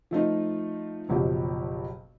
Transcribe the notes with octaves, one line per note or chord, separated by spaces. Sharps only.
F3 A3 D#4 F4
F#1 B1 F3 G4